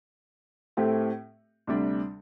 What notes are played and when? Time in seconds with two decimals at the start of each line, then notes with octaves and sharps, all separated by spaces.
0.77 A2 A3 C4 G4
1.67 D2 C3 G3 D4